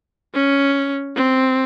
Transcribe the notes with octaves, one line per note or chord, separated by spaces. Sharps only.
C#4
C4